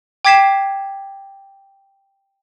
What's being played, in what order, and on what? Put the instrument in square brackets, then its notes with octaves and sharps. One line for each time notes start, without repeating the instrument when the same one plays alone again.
[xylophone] G5 D6 G#6 B6 C7 E7